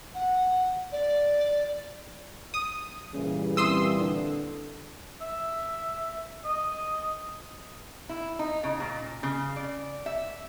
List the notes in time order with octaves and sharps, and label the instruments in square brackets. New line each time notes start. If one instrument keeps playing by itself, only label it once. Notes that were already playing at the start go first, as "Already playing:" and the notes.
[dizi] F#5
D5
[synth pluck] D#6
[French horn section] A#2 E3 G3 [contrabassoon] C#3
[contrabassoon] C2 [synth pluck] C6 D#6 E6
[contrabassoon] D3
[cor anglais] E5
D#5
[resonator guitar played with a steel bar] E4
D#4
C#3
A#2
C#3
D5
E5